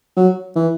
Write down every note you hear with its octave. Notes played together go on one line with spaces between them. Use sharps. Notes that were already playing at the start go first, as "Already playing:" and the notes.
F#3
E3